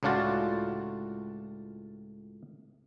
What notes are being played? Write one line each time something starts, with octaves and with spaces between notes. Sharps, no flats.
C#2 A2 D4 F4 F#4 A5